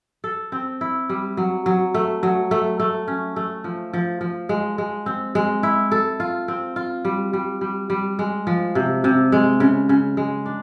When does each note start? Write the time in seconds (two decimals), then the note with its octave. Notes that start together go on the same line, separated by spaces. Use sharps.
0.24 A4
0.52 C4
0.81 E4
1.09 G3
1.37 F#3
1.66 F#3
1.94 A3
2.23 F#3
2.51 A3
2.80 A3
3.08 C#4
3.36 A3
3.64 F3
3.93 F3
4.21 F3
4.49 G#3
4.78 G#3
5.06 C4
5.35 G#3
5.63 E4
5.92 A4
6.20 F4
6.48 C4
6.76 F4
7.05 G3
7.33 G3
7.61 G3
7.90 G3
8.19 G#3
8.47 F3
8.75 C3
9.04 C3
9.32 G#3
9.60 C#3
9.89 C#3
10.17 G#3
10.46 D4